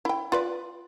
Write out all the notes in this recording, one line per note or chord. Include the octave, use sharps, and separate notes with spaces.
E4 G5
F4 B4 D5